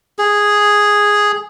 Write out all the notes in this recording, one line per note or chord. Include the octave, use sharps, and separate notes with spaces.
G#4